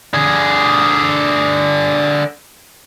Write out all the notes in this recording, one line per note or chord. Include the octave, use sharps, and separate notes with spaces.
D3 G#4